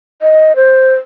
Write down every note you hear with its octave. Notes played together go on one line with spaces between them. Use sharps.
D#5
C5